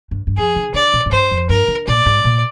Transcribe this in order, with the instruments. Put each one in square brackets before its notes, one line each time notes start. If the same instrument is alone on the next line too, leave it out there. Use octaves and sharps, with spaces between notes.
[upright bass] G2
G2
[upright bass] F2 [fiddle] G#4
[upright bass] D3
[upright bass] D3 [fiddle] D5
[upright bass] A#2
G#2
[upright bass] G2 [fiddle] C5
[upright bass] F2
[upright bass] G2 [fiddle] A#4
[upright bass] D3
[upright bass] A#2 [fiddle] D5
[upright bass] G#2
A#2